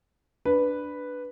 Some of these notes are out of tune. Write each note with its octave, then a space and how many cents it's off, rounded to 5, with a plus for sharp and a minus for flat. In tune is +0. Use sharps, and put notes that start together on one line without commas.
D4 +0 B4 +0